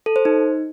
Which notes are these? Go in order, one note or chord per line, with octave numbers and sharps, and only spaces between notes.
A4
C5
D#4